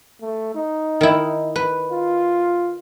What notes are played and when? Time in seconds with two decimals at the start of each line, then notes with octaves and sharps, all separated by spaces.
0.21 A3
0.55 D#4
1.01 D#3 E4
1.56 B4
1.92 F4